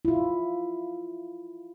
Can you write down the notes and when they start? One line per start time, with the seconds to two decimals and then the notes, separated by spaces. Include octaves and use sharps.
0.05 E4 F4